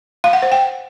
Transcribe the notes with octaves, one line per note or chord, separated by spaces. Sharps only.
F5
F#5
C5
G5